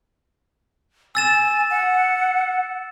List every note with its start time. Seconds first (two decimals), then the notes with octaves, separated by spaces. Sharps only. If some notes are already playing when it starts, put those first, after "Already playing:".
1.15 G#5 E6 A6 E7
1.71 F#5